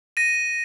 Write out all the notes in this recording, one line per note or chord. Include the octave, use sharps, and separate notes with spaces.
A#6 D#7